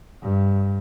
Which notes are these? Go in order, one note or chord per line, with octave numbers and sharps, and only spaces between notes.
G2